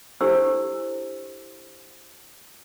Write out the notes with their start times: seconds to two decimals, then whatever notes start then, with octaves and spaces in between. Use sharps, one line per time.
0.21 D4 E4 G4 A4 C5 E6